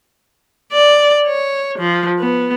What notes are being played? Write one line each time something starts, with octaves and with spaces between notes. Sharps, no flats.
D5
C#5
F3
B3